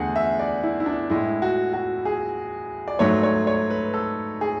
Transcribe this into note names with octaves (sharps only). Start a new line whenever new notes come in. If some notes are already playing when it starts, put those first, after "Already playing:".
Already playing: E2 D3 A3 G#4 F#5
E5
D5
E4
E4
D4
A2 G#3 E4
F#4
F#4
G#4
D5
G#2 F#3 A3 C#5
C#5
C#5
B4
A4
G#4